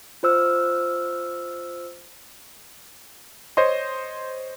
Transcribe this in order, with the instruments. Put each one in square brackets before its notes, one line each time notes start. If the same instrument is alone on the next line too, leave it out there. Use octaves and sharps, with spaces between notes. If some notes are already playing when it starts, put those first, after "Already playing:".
[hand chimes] F4 C5 E6 F6
[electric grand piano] C5 C#5 D#5 C6